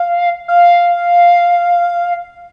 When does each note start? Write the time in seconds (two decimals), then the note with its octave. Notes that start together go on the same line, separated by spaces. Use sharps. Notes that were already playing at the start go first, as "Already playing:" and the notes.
Already playing: F5
0.48 F5